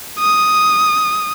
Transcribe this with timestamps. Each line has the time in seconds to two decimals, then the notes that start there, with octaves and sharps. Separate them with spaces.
0.19 D#6